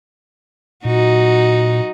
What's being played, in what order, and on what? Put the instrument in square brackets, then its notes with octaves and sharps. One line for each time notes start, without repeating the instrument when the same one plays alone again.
[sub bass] A#2 [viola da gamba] F#3 D#4 F#4